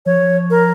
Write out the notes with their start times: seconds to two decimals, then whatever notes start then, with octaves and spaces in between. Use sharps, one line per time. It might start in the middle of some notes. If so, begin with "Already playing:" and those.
0.06 F3 C#5
0.50 A#4